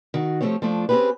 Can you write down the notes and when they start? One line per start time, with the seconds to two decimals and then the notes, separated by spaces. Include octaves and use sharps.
0.14 D#3 F#4
0.41 F3 A3 A#3 C4 G4 C#5
0.62 F3 A3 D4 F4
0.89 C4 C#4 F4 G4 G#4 B4